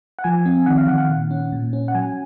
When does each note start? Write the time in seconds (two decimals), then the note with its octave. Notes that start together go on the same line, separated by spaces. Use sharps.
0.19 F#5
0.24 F3 G#5
0.46 C4
0.66 D#3 F#5
0.78 F5
0.88 D#3 F#5
0.98 F#5
1.09 A#2
1.31 C#4
1.52 A#2
1.73 C#4
1.88 F#5
1.95 F#3 G#5